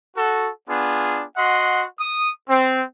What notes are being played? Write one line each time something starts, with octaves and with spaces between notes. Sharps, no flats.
F#4 A4
B3 D4 F4 G#4
F#4 D#5 F#5 C6
D#6
C4